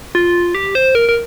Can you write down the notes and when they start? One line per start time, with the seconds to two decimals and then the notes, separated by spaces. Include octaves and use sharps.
0.15 F4
0.55 G4
0.75 C5
0.95 A#4
1.09 A#4